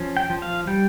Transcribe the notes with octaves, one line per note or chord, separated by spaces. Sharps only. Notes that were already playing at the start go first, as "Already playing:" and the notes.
Already playing: F3 C#4
G5
F3
F5
G3 G5